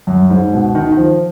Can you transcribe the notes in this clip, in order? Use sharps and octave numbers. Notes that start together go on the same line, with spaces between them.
F#2
G#2
B2
D#3
D#3
F3